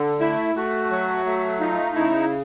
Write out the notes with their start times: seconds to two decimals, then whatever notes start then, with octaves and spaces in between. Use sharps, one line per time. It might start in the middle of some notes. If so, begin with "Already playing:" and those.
Already playing: D3
0.19 A3 E4
0.55 A3 F#4
0.90 F#3
1.26 A3
1.60 D#4 F4
1.95 C#3 E4